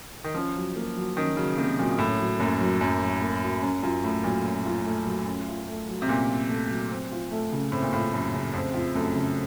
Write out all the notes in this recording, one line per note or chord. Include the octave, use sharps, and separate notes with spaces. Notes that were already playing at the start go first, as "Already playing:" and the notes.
D#3
F3 C#4
F#3
A#3
F#3
D#3 C#4
C#3 F#3
C3 A#3
A#2 F#3
A2 C#4
F#3
F#2 A#3
F#3
F#2 C#4
F#3
A#3
F#3
F#2 C#4
F#2 F4
A2 A3
A#2 F#3
C#4
F4
A3
F#3
C#4
F4
A3
F#3
C3
A#2 C#4
F4
A3
F#3
C4
F4
A3
C#3
A2 C4
A#2
A2 F4
F#2 A3
C#3
F2 C4
F4
F#2 A3
C#3